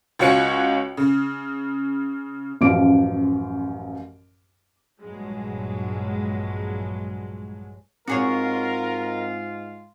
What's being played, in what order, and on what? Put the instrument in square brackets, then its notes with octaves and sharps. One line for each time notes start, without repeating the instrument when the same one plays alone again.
[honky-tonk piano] C#2 F4 F#4 C#5 C#7
C#3
[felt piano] A1 F#2 F3 F5 D6 D7
[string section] A#1 G2 F#3 G#3
[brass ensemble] G#2 G#3 F4 [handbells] C4 [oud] F#4 G#4 C#5 [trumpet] A#4